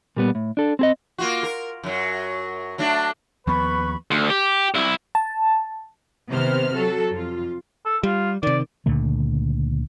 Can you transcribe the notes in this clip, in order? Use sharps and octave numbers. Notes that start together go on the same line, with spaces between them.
A#2 G3 B3
A2
D4 A4
C4 G#4 D#5
A#3 F4 F#4
A#4
F#2 F#3
F#3 A3 D4
D#2 F3 B3 B4 B5 C#6
D2
G4
C2 E4
A5
C3 D#3 B3 C5 F6
F#3 F#4 A4
F2 F4
A4
G3 F4
C3 D#3 D5
C#2 A#2 D3 A3